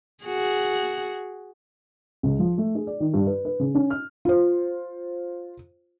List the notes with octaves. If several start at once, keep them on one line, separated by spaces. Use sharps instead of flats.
F#4 G#4
C#2
F3
A3
G#4
D5
D#3
G2
B4
B4
C#3
C#4
F6
F4 C5